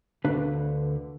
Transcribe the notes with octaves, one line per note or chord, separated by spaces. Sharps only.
D2 D3 D4 B4 F5